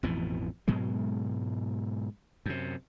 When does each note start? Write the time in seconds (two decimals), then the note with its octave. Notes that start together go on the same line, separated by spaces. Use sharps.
0.03 A1 F2 B2 E3
0.68 G#2 B2 F#3 G#3
2.46 F#2 C3